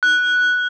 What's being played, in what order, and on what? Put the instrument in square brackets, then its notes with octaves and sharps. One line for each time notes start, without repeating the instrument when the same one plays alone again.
[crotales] F#6